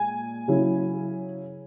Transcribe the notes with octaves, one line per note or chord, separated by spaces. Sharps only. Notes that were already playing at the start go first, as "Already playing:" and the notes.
Already playing: A#2 G#3 G#5
C#3 F#3 C#4 E4